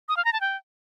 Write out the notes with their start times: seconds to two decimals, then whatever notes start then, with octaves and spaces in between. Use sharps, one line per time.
0.09 D#6
0.17 F5
0.25 A#5
0.33 A5
0.41 G5